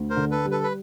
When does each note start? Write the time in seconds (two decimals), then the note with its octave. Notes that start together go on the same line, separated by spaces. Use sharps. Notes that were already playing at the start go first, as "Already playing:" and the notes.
Already playing: D2
0.10 A#4 C5
0.16 D3
0.31 A4 B4
0.45 G3
0.51 A4 B4
0.64 B4